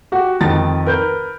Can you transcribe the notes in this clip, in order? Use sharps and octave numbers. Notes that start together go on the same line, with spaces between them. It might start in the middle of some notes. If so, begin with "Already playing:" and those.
F#4 G4
F2 D#3 A6
A#4 B4 G6